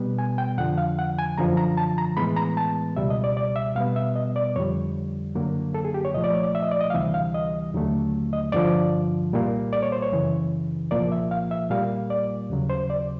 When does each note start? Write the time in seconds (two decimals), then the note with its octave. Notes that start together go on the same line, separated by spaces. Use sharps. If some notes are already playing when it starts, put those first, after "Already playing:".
Already playing: B2 G3 B3
0.19 G#5
0.38 G5
0.58 F2 D3 F3 F#5
0.78 F5
0.99 F#5
1.18 G#5
1.38 F#2 D3 F3 A#5
1.57 A#5
1.77 A5
1.98 A#5
2.17 A2 E3 G#3 B3 B5
2.37 A#5
2.57 A5
2.96 C#2 B2 G3 E5
3.10 D#5
3.24 D5
3.37 D5
3.56 E5
3.76 B2 G3 B3 F5
3.96 E5
4.16 D#5
4.36 D5
4.56 F2 D3 G3 C#5
5.35 F#2 D3 F#3 A#3
5.74 A4
5.85 G#4
5.94 G4
6.05 C#5
6.14 C2 A#2 F3 A3 D#5
6.24 D5
6.34 C#5
6.43 D5
6.55 E5
6.63 D#5
6.71 D5
6.81 D#5
6.90 F5
6.94 D2 C3 E3 G3 E5
7.14 F5
7.34 D#5
7.74 D#2 D3 F#3 A3
8.33 D#5
8.52 G2 D3 F3 D5
9.32 C2 A#2 G3 A#3
9.73 D5
9.83 C#5
9.92 C5
10.02 C#5
10.12 F#2 C#3 E3
10.91 C2 A#2 F3 A#3 D5
11.12 E5
11.31 F5
11.51 E5
11.70 A#2 G3 A#3 F5
12.10 D5
12.50 D#2 C#3 F#3
12.70 C5
12.90 D5